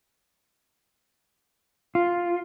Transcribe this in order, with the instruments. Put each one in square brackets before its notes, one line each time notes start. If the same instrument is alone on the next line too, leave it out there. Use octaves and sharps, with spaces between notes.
[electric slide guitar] F4